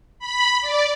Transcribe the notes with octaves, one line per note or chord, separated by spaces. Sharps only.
B5
D5